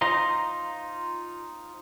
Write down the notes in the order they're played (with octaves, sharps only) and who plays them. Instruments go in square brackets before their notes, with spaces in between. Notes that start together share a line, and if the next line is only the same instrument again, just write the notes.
[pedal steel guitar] D#4 F4 C5 A#5